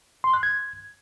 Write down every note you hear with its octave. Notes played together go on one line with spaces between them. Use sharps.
C6
F#6
G#6